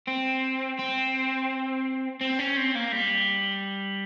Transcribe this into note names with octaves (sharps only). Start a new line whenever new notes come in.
C4
C4
C4
C#4
C4
A#3
G3